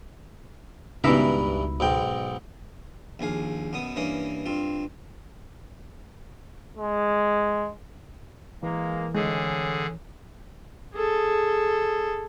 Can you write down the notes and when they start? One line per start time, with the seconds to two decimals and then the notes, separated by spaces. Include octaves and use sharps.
1.04 C#2 G2 B2 E3 D#4 A#4 E5 B5
1.80 B1 G#2 G5
3.19 A#1 D#2 G#4 F5
3.73 F#2 B2 B3 D#6
3.96 G2 E3 A#3 C#4 D#6
4.46 G2 C4 F4
6.77 G#3
8.63 E3 G#3 A#3
9.15 A2 D3 G#3 C#4 G#4
10.94 G#4 A4